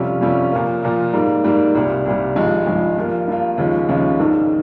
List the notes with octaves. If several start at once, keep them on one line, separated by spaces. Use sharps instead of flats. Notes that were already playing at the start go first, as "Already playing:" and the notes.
Already playing: F2 C3 G3 C#4 F4
F2 C3 G3 C#4 F4
A#2 F3 A#3
A#2 F3 A#3
G#2 G3 A#3
G#2 G3 A#3
C2 A#2 G3
C2 A#2 G3
G#1 G2 F3 G#3
G#1 G2 F3 G#3
G2 F3 A#3 F4
G2 F3 A#3 F4
D#2 C#3 F3 G#3 C#4
D#2 C#3 F3 G#3 C#4
A#1 G#2 D#3